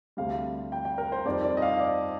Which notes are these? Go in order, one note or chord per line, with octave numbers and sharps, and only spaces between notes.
D2 C3 G3 F5
G5
G5
A#4
C5
F2 D#3 G3 D5
D5
D#5
F5
D5